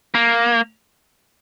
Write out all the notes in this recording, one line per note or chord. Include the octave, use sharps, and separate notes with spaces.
A#3